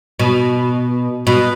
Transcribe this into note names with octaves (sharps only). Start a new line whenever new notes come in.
B2
B2